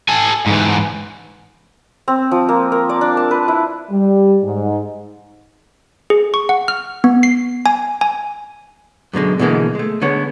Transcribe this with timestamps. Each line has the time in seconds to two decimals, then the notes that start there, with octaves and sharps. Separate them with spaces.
0.09 A4 G#5
0.46 G#2 E3
2.08 C4
2.31 F3
2.49 A#3
2.72 A#4
2.89 D5
3.01 D4
3.17 A5
3.31 B4
3.48 E4
3.90 G3
4.44 G#2
6.10 G#4
6.34 C#6
6.49 F#5
6.68 F6
7.04 B3
7.23 C7
7.66 G#5
8.01 G#5
9.13 F#2 B2 D3 G#3
9.39 B2 D3 E3 G#3 A#3
9.75 G#3 A3
10.02 D3 G#3 B3 C#5